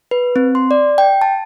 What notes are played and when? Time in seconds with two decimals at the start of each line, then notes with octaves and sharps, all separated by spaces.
0.11 B4
0.36 C4
0.55 C6
0.71 D5
0.98 G5
1.22 A5